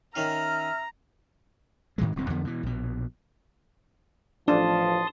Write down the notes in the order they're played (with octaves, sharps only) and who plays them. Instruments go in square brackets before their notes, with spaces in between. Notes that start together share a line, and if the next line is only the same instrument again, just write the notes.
[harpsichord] D#3 C#4 F5 [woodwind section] E5 F6 [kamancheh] A#5
[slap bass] G#2 D#3 E3 G#3
D1 C2 A2 C4
F2 D3 F3 B3
B2 E3
A#1 B2
[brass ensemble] A1 F3 [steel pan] D4 [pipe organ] A5 C6 D#6